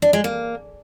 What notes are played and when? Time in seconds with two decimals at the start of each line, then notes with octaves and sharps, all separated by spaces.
0.02 D4
0.13 G#3
0.24 A#3